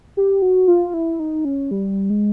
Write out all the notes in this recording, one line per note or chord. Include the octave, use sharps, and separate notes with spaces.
G4
F#4
F4
E4
D#4
C#4
G3
G#3